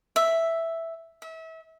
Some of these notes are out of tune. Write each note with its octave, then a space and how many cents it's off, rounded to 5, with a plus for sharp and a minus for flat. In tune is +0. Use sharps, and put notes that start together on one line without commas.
E5 +0
E5 -30